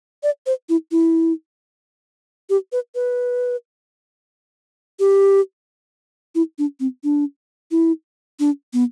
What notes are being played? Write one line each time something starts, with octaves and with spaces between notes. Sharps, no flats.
D5
C5
E4
E4
G4
B4
B4
G4
E4
D4
C4
D4
E4
D4
B3